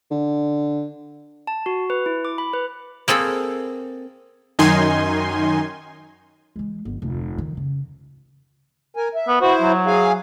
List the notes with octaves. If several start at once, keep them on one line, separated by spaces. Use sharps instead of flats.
D3
A5
F#4
B4
E4
D6
B5
B4
A#3 C4 G#4 A4 B5
F#2 D#3 D#4 G#5 C6
E3 G#3
G1 F3
F1 D2
D#3
C#3
A#4 G#5
E5
B3
E4 F#4 C5
F#3
G#4 F5 G#5